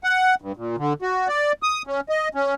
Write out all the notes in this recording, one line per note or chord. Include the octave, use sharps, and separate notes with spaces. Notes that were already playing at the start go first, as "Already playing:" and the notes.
F#5
G2
A#2
D3
F#4
D5
D#6
C#4
D#5
C#4